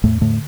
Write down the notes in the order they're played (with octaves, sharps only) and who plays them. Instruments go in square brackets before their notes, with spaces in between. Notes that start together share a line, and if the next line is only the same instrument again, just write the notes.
[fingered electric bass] E2 A2 A3
A2 D3 A3